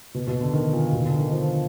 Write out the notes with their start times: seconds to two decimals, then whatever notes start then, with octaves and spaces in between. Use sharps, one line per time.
0.14 B2
0.27 B2
0.41 D3
0.54 D#3
0.73 A#2
0.93 B2
1.06 D3
1.18 D#3
1.31 F3